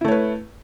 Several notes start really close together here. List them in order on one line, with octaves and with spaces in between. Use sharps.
E4 A3 C#5 B4